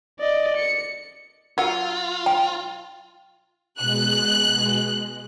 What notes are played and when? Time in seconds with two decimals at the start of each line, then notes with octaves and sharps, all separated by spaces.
0.20 D5 D#5
0.57 C#7
1.58 F#3 F4 F#5
2.26 G5
3.79 B2 G#3 F#6